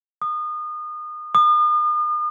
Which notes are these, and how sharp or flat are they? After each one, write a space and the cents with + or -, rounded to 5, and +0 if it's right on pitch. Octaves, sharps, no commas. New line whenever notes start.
D#6 -30
D#6 -40